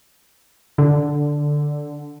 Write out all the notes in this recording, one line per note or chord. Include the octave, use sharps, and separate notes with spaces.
D3